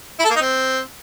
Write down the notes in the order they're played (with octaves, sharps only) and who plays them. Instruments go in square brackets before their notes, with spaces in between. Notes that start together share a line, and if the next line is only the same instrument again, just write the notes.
[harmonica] E4
A4
A#3
D#4
C4